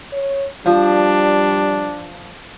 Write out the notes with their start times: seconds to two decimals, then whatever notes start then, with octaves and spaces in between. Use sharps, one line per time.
0.13 C#5
0.66 F3 G3 D4